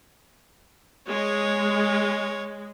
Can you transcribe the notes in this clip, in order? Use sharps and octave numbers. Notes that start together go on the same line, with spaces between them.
G#3 C#5